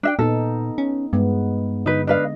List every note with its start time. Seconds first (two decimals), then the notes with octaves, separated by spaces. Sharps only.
0.03 D4 E5 G5
0.19 A#2 B3 D#4 A4
0.78 C#4
1.13 G2 G#3 B3
1.86 D3 D#4 B4
2.07 D4 B4 D#5 F5